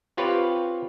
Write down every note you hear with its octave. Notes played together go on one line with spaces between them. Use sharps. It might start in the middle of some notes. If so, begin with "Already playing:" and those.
C4 F4 G4 B4 C#5